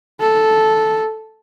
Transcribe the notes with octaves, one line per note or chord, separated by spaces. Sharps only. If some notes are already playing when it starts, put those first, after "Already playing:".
A4